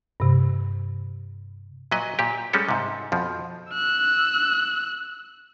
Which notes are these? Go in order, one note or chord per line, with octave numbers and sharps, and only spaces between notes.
G2 C3
A#2 F#3 B4 D#5
A#2 G4
G3 G#3 C#4 A4
G#2 C3
F2 B2 F3
E6 F#6